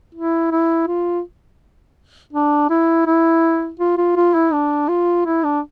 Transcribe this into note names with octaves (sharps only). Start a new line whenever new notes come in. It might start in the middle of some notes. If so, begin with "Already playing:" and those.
E4
E4
F4
D4
E4
E4
F4
F4
F4
E4
D4
F4
E4
D4